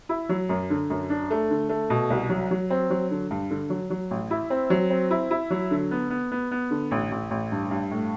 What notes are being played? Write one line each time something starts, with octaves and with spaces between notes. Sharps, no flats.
E4
F#3
F#2
D3
F#2
D4
A3
D3
A3
B2
C2
F#3
F#3
C4
F#3
D3
G2
D3
F#3
F#3
A1
E4
C4
F#3
C4
E4
E4
F#3
D3
B3
B3
B3
B3
D3
A1
A1
A1
G2
G2
A2